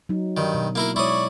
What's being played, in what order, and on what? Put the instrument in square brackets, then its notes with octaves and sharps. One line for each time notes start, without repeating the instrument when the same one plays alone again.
[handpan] F#3 D#4
[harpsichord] G2 D#3
[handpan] B2
[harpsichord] A#3 E4 A#4
[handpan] G#3 C#5 [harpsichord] E4 D#6 [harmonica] D5 C#6